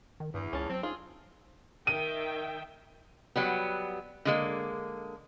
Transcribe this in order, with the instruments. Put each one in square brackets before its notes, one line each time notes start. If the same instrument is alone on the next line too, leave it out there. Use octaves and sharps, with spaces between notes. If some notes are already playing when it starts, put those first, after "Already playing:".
[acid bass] D#3
[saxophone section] E2 [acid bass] G2
[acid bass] C#2 [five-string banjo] C#4 A5
[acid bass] F#3 [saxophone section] C4
[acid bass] D#4 [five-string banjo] F4 [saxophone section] G#4
[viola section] D#3 E5 G5 [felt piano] D#7
[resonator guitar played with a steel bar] F#3 G3 B3
D3 G#3 A#3